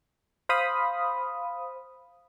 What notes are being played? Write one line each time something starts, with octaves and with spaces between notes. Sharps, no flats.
C5 F5 B5 D#6